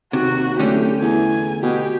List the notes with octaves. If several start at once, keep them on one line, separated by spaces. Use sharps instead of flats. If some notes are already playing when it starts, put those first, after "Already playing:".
D#2 C3 F#4
D1 D3 A3 C#4 G4
E2 G#5
B2 G4